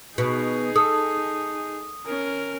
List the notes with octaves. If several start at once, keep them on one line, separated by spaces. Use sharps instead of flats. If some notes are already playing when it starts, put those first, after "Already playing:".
B2 D#4 G#4
A4 D#6
C#4 A#4